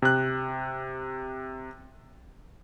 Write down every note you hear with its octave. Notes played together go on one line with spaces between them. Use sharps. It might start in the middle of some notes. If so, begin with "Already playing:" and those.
C3 F#6